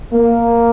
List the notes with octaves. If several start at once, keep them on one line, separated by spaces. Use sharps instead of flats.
A#3